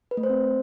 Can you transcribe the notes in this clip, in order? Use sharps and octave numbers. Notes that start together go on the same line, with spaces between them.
B4
A3
C5
C4